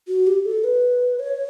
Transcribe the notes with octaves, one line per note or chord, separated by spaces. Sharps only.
F#4
G4
A4
B4
C#5